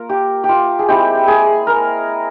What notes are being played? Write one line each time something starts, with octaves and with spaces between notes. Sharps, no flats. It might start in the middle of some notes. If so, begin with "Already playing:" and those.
Already playing: A#3 F4 A#4
G4
G4
F4
G#4
G#3 C4 E4 G4
G#4
A#4